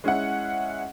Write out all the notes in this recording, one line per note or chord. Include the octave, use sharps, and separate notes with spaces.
G#3 C#4 E4 F#5